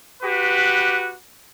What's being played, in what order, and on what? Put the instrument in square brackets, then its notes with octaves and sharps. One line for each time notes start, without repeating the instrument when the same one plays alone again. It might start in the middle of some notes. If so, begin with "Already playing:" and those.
[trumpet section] F#4 G4 B4